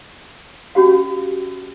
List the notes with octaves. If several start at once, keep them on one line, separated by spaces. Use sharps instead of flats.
C#4 F#4 G4 F5